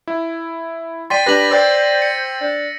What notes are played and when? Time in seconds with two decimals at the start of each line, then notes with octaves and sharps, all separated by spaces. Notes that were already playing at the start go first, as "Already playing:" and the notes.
0.08 E4
1.10 D5 G5 C6 A6 B6 D#7
1.26 D4 G4 B4 A#6 F#7
1.51 C5 D5 G5 E6 G6 A6
2.02 C#7
2.41 D4